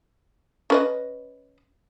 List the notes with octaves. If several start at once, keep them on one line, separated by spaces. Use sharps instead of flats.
C#4 B4 D#5